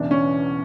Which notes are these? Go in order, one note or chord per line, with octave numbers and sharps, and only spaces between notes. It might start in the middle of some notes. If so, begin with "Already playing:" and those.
Already playing: E1 E2 C#3 E3 D4
C#4